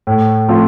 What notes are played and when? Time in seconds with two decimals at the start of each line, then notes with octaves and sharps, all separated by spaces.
0.07 A2
0.48 F3 A3 C4 F4